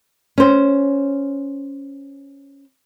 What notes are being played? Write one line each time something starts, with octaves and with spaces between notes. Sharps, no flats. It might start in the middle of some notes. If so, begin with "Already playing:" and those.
C#4 C5